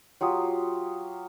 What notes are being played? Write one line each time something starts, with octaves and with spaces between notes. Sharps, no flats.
F#3 F4 G4 D#6